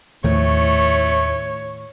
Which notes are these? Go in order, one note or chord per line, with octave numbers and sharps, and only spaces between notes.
D#2 A2 D#3 F3 A3 C#5